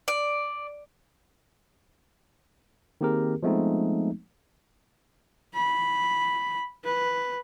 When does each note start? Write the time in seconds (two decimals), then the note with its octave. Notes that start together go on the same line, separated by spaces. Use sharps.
0.08 D5
3.01 D#3 A#3 C4 G4 G#4 A#4
3.43 F3 G#3 A3 B3 C4 D#4
5.55 B5
6.85 B4